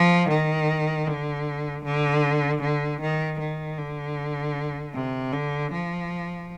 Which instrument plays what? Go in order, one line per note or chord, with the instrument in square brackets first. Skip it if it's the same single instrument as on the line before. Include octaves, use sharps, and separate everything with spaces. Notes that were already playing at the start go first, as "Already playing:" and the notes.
Already playing: [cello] F3
D#3
D3
D3
D3
D#3
D#3
D3
C3
D3
F3